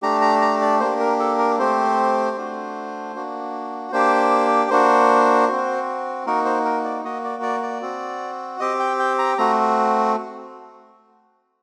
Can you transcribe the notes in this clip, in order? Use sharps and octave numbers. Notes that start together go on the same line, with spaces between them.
A3 D4 G4 A#5
A#5
A#5
D5
A#3 D4 G4 C5
A#4
A4
A#4
A3 C4 G4 C5
A3 D4 F#4
A#3 D4 F#4
A#3 D4 G4 C5
A#3 D4 F#4 C5
C4 F#4
A#3 D#4 F#4 A#4
C5
A#4
D5
A#3 F#4 D#5
D5
D5
D5
C4 F#4
C4 G4 D#5
G5
G5
A#5
A3 C4 F#4 A#5